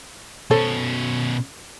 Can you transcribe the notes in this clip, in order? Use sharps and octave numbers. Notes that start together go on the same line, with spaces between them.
B2 C#4 A4 C5 C#5